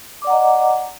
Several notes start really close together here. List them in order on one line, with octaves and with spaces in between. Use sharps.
D6 D5 F#5 A#5 D#5